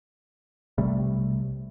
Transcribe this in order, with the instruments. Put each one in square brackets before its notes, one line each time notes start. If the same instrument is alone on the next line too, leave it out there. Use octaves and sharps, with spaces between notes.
[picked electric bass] B1 C3 G3 A3